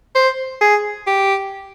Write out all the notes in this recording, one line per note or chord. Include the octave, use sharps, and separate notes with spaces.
C5
G#4
G4